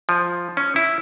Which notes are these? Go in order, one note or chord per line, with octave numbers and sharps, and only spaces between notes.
F3
C#4
E4